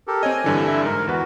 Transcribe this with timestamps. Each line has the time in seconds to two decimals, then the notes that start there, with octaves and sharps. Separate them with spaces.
0.07 G4 A4 A#4
0.23 C4 C#5 D#5 G#5
0.44 G2 D3 E3
0.66 E4
0.85 G#2 A#4
1.07 E2 F#4 B4